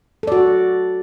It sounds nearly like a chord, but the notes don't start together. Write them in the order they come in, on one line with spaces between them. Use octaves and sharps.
A4 D5 F#4